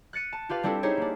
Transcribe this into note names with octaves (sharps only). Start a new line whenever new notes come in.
F#6 A6 C#7 D#7
A5
F4 G4 B4 F5
G3 C4 D4 E4 G4 A4
D#4 E4 G4 G#4 C5 C#5
A#3 D4